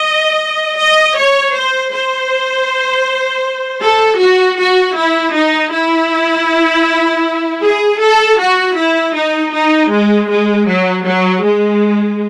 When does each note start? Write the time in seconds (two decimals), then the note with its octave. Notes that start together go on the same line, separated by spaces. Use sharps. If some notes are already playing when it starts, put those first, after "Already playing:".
Already playing: D#5
0.79 D#5
1.17 C#5
1.55 C5
1.92 C5
3.83 A4
4.21 F#4
4.59 F#4
4.97 E4
5.36 D#4
5.73 E4
7.63 G#4
8.01 A4
8.39 F#4
8.77 E4
9.15 D#4
9.54 D#4
9.91 G#3
10.30 G#3
10.68 F#3
11.05 F#3
11.43 G#3